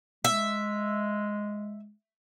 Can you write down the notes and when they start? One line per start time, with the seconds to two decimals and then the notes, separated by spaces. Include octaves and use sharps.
0.25 G#3 E5